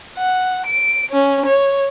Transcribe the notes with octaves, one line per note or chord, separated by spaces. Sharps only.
F#5
D7
C#4
C#5